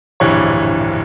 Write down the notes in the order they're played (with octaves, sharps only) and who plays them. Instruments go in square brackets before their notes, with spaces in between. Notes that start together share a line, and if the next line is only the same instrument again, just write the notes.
[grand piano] D1 A#1 G2 E3 G3 C#5